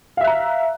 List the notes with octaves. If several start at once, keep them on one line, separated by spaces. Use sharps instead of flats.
E5 F5 A#5 F#6